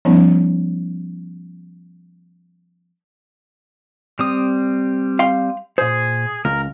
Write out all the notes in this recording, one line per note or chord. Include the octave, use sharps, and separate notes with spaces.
F3 G3 B3 C#4 D#4
G3 C4 D#6
F5 G5 C6
A#2 G#4 C5
C#2 A#4